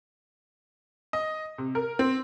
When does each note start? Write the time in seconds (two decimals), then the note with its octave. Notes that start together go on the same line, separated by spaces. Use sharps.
1.13 D#5
1.58 C3
1.75 A#4
1.99 C4